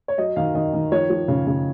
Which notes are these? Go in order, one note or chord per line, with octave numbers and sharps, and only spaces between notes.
C#5
F#3 D#5
D#3 F5
D#3 D#5
D#3
F3 C#5
F3
C#3
C#3